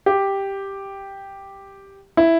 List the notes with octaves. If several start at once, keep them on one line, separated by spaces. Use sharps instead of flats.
G4
E4